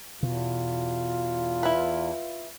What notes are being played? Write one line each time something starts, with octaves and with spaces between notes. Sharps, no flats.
E2 B2 F4
E4 B4